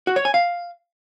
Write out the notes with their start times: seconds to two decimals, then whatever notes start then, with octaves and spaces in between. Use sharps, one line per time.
0.07 F#4
0.16 C#5
0.25 G#5
0.34 F5